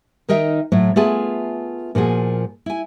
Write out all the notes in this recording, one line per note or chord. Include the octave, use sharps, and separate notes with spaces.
D#3 D#4 A#4 D#5 E5 G5
A2 F#3 A3
A3 B3 F4 G#4 G#5 A5
A#2 F3 F#4 G#4
E4 G#5